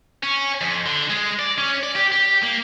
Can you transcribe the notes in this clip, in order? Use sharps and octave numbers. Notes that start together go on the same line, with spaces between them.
C#4
F2
D3
G#3
D5
C#4
D5
G4
G4
A#3